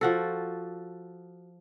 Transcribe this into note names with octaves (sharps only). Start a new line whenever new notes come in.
F3 F#4 A4